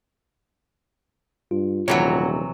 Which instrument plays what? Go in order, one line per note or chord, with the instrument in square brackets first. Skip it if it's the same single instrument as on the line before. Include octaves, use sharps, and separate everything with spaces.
[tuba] G2 [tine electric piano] F4
[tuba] D#1 [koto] C3 E3 F#3 [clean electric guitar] F#4 C#5